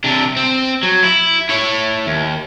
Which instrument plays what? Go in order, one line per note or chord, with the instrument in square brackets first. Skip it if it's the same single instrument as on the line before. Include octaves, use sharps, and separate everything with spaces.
[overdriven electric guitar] C3 D4
C4
F#3
E4
E4 C#5
D#2